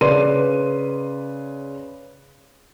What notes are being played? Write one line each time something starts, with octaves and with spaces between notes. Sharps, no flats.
C#3 B4 D5 C6 D#7